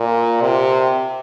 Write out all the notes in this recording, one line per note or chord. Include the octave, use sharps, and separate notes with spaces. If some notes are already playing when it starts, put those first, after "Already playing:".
Already playing: A#2
C3